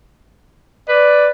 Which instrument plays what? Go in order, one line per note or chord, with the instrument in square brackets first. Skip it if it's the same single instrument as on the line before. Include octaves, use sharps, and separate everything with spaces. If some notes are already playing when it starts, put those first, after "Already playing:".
[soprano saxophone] B4 [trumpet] D5